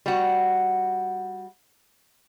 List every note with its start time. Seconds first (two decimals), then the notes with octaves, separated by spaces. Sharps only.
0.06 G3 F#4